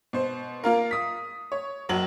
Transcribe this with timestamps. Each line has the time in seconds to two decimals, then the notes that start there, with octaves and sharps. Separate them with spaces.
0.13 B2 C5
0.64 A#3 F4 A#4
0.91 D#6 B6
1.52 C#5
1.89 F#1 F#3 F#7